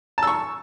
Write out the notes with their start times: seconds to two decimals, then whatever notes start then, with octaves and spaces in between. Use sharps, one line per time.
0.18 A5
0.23 E6
0.27 C#6